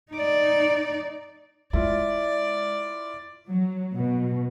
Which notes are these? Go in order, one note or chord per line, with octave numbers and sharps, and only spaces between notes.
D#4 D5
G#3 E4 F4 D5
F#3
B2